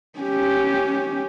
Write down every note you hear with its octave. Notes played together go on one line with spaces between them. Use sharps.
C#4 G4